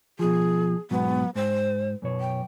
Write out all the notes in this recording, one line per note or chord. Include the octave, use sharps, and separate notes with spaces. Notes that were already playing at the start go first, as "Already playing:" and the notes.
B2 F3 G#4
G#2 B2 F#3 B3
G#2 C5
F#2 B2 C#5
G5